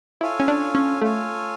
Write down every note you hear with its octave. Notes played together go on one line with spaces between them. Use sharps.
E4 F4 A4 C#5 F5 G#5
C#4
D4
C#4
A3 F4 A4 C#5 F5 G#5